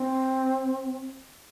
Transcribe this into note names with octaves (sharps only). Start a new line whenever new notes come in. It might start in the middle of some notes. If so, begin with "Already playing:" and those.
Already playing: C4